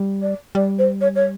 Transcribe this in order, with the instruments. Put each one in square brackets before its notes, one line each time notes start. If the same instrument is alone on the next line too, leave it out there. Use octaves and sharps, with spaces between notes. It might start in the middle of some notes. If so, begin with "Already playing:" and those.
Already playing: [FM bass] G3
[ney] D5
[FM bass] G3 [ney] D5
[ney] C5
C#5
C#5